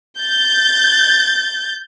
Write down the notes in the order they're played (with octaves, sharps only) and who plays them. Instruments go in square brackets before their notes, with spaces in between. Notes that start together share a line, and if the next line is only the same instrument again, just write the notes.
[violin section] G6 A6